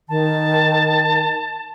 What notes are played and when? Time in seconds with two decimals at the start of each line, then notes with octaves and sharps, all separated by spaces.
0.09 D#3 A5